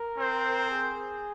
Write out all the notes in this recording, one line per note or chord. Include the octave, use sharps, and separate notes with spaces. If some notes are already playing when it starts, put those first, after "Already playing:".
Already playing: A#4
C4 C5
G#4